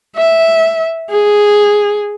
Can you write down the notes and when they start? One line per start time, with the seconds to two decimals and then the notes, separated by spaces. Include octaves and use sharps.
0.16 E5
1.10 G#4